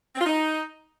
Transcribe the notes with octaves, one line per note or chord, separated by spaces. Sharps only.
C4
F4
D#4